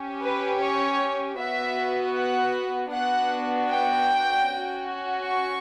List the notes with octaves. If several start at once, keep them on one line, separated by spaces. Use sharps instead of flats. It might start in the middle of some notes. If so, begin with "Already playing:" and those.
Already playing: C#4 G4
B4
C#5
B3 F#4 E5
F#5
B3 D4 F#4 F#5
G5
C#4 F#4
C#6